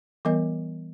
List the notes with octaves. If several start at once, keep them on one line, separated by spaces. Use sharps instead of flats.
E3 G3 B3 A#4 D#5